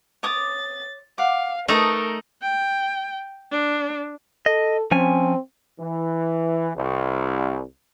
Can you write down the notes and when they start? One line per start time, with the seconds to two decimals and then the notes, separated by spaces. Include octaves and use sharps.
0.23 C#5 D6 D#6 A6
1.18 F5 F#5 D6
1.68 A3 D#4 A#4 B4 A5 D#6
2.42 G5
3.52 D4
4.46 A4 D#5
4.92 F3 C4 C#4 G#5
5.80 E3
6.77 C2